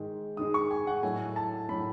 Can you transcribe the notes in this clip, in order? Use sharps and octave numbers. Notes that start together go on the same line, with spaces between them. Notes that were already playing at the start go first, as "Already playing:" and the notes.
Already playing: G#2 D#3 G#3
G#2 D#3 G#3 D#6
C#6
G#5
F#5
A2 F#3 A3 G#5
A5
A2 F#3 A3 B5